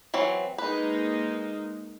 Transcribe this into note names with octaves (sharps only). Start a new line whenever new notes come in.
E3 F#3 C4
G#3 A#3 D#4 B4